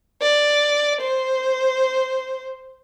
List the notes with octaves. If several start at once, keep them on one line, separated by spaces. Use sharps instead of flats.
D5
C5